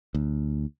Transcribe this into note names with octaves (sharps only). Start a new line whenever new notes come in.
D2